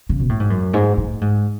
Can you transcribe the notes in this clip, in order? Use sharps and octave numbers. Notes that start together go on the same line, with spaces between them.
C#3
B2
A2
G#2
F#2
G#2
A2
G#2